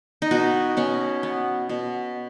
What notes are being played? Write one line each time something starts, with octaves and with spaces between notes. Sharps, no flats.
D#4
B2 F#4
B2 C#4
B3
B2